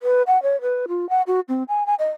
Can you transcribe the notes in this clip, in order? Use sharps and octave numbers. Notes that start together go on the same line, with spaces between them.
B4
F#5
C#5
B4
F4
F#5
F#4
C4
G#5
G#5
D#5